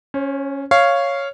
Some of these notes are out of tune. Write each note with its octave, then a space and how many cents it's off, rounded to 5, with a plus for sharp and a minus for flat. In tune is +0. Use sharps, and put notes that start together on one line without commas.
C#4 +0 C5 +45
C#5 +0 F5 -10